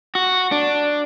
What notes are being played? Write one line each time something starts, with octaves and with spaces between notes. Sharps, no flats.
F#4
D4